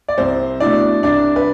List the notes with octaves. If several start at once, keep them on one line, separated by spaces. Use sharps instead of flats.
D5
C2 C4 C5
B2 A3 D4 E4 D5
C2 D4 D5
B4